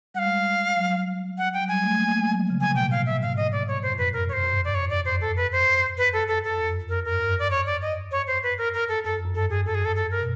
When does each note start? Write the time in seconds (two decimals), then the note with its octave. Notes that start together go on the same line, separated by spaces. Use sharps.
0.14 G3 F#5
0.19 F5
0.25 G#3
0.36 G3
0.77 F#3
1.38 F#5
1.54 G5
1.61 F#3
1.68 G3 G#5
1.84 A3
1.99 A#3
2.09 A3
2.19 G#3
2.30 F#3
2.40 F3
2.50 C#3
2.60 C3 G#5
2.70 B2
2.75 G5
2.81 A2
2.91 F5
3.06 E5
3.21 G#2 F5
3.37 D#5
3.52 D5
3.68 C#5
3.82 F#2 C5
3.93 F2 B4
4.05 F#2
4.13 A#4
4.29 C#5
4.33 G2 C5
4.44 F#2
4.55 F#2
4.64 F2 D5
4.74 F#2 C#5
4.83 F2
4.90 F#2 D5
5.02 F2 C5
5.13 F#2
5.21 F2 A4
5.36 F2 B4
5.52 C5
5.98 F#2 B4
6.13 A4
6.28 A4
6.44 A4
6.58 F2
6.70 F#2
6.81 F2
6.89 A#4
7.05 G2 A#4
7.20 F#2
7.39 D5
7.50 C#5
7.66 D5
7.82 D#5
8.11 C#5
8.27 C5
8.43 B4
8.58 A#4
8.74 A#4
8.88 A4
9.04 F#2 A4
9.14 F2
9.24 F#2
9.35 G2 A4
9.50 F#2 G#4
9.66 F#2 A4
9.75 G#4
9.85 A4
9.96 A4
10.11 A#4
10.20 B2